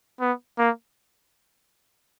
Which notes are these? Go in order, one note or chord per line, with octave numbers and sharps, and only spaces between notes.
B3
A#3